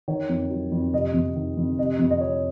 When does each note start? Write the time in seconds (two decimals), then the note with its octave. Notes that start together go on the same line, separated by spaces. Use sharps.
0.08 D#3 C#5
0.29 F2
0.51 F#3
0.72 F2
0.93 C3 D#5
1.14 F2
1.36 D#3
1.57 F2
1.79 C3 D#5
1.99 F2
2.11 D#5
2.21 F3 C#5